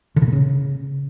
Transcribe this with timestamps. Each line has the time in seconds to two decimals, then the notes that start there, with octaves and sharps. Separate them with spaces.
0.16 D3
0.22 C#3
0.27 A#2
0.33 C#3